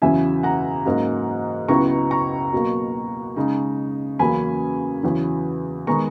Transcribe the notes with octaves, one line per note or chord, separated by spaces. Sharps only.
E2 C#3 F#3 C#4 E4 E5 G#5
F#5 A#5
G#2 F#3 A#3 C#4
C#2 C#3 F#3 B3 E4 A#5 C#6
A#5 C#6
B2 F#3 A#3
C#3 G#3 D#4
E2 C#3 F#3 A#3 C#4 G#5 B5
E2 C#3 F#3 C#4 E4
D#3 G#3 B3 A#5 C#6